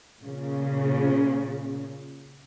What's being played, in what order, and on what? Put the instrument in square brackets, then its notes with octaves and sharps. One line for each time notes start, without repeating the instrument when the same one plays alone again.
[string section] A#2 C#3